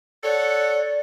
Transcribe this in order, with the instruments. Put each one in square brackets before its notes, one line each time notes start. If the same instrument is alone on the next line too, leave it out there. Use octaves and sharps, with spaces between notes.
[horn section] A4 C#5 F#5 [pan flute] D5